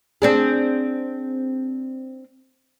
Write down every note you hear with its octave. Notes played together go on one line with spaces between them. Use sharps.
C4 D4 G#4